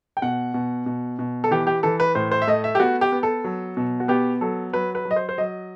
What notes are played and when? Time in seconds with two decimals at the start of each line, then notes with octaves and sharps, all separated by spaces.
0.17 G5
0.22 B2 F#5
0.54 B2
0.86 B2
1.19 B2
1.44 A4
1.51 E3 G4
1.67 G4
1.83 E3 A4
2.00 B4
2.15 A2 C5
2.32 C5
2.42 E5
2.47 A3 D#5
2.64 E5
2.75 G4
2.80 B3 F#4
3.01 G4
3.12 B3
3.23 A4
3.44 F#3
3.77 B2
4.00 F#4
4.08 B3 G4
4.41 F#3 A4
4.73 F#3 B4
4.95 B4
5.05 F#3
5.11 D#5
5.16 C5
5.29 C5
5.38 F#3 D#5